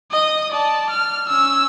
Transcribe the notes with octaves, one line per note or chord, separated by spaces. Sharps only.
D#5 D#6
D5 A5
F6
C#4 E6